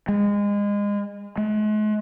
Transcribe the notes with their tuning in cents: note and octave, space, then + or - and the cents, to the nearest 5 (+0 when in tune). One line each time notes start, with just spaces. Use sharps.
G#3 -25
G#3 +45